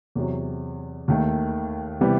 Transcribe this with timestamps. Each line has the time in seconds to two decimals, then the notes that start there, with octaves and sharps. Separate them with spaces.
0.15 E2 C3 F#3
1.08 D#2 D#3 A3
2.01 C3 E3 G3 B3